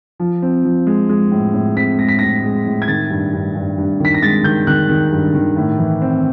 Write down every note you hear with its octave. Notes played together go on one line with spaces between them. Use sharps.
F3
C4
F3
G#3
G#3
A2
A2
C4 B6
G#3 A#6
B6
A2 A#6
G#3
A2
G#6
D#3 A6
G2
G2
G2
G2
D#3 B6
A#6
G#3 A6
D#3 G6
D#3 F#6
D#3
G2
D#3
A2
E3
C4